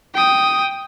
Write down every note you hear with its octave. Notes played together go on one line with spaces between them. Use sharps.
G5 D#6